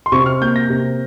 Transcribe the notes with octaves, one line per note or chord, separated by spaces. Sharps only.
C6
C3 C#6
F6
A#3 G6
A#6
C3